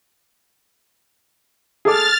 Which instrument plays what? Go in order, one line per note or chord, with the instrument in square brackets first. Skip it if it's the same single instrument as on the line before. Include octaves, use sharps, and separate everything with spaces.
[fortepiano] G#4 A4 D6 [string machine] F6 A6